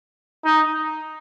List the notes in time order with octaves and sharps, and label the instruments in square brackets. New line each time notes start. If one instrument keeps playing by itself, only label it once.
[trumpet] D#4